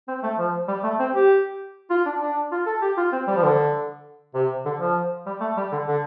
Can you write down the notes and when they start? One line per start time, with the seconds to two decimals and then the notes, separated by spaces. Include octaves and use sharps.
0.08 C4
0.23 A3
0.38 F3
0.68 G3
0.84 A3
0.99 C4
1.14 G4
1.90 F4
2.06 D4
2.21 D4
2.52 F4
2.66 A4
2.82 G4
2.97 F4
3.12 C4
3.27 G3
3.36 F3
3.43 D3
4.34 C3
4.65 D3
4.80 F3
5.26 G3
5.41 A3
5.57 G3
5.72 D3
5.87 D3